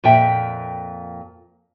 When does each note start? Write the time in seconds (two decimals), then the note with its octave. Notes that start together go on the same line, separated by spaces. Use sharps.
0.04 F2 A#2 E5 G5